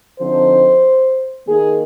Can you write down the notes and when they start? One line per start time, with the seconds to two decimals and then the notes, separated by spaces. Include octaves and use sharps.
0.19 D3 F3 C4 D#4 C5
1.47 D#3 A#3 D#4 G#4